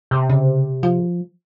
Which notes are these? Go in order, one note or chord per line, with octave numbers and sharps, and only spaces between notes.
C3
C#3
F3